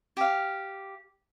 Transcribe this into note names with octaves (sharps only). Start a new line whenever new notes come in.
G4 F5